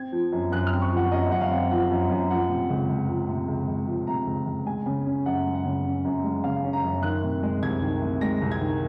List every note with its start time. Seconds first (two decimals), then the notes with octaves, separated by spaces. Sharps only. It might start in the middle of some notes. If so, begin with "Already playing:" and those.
Already playing: C4 G#6
0.12 F3
0.32 F#2
0.52 F#2 F#6
0.67 C4 F6
0.81 C#6
0.92 F3 F#5
1.11 F#2 D#5
1.31 F#2 F#5
1.41 F5
1.51 C4
1.71 F3 F#5
1.91 F#2
2.10 F#2
2.30 F3 F#5
2.49 C3
2.70 C#2
2.89 C#2
3.09 F3
3.29 C3
3.48 C#2
3.68 C#2
3.87 F3
4.07 C3 A#5
4.26 C#2
4.47 C#2
4.66 G#3 G#5
4.86 C#3
5.06 C#4
5.26 F#2 F#5
5.46 G#3
5.55 F#5
5.65 C#3
5.85 C#4
6.05 F#2
6.24 G#3
6.44 C#3 F5
6.64 C#4
6.73 A#5
6.84 F#2
7.03 D#3 F#6
7.23 C3
7.43 G#3
7.62 C2 G#6
7.82 D#3
8.02 C3
8.21 G#3 A#6
8.42 C2
8.51 G#6
8.61 D#3